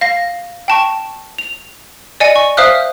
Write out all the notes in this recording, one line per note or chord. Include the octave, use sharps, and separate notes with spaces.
F5 A#6
G5 A5 C#6
F7
D5 D#5 G#5 C#7 D#7
C#6
C5 E5 F5 D#6 F6 F#6